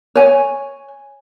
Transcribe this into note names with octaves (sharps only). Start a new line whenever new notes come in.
C#5 G#5